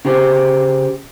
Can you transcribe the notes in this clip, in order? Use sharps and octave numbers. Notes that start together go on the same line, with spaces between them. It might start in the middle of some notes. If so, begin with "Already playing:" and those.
C#3 G4 C5